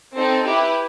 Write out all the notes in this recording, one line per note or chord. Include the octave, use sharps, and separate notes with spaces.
C4 D#4 A4
E4 G4 B4